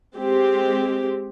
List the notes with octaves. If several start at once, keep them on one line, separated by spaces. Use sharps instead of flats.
G#3 C4 G4